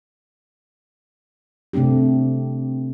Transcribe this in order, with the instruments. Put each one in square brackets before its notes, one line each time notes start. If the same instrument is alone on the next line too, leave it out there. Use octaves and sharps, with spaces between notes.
[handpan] C3 A3 C4 D4 G4